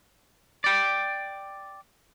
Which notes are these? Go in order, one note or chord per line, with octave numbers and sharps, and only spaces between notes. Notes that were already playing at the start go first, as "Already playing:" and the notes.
D5 G5